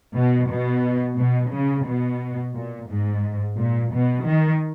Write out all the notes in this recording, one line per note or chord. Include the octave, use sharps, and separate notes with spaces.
B2
B2
B2
C#3
B2
A#2
G#2
A#2
B2
D#3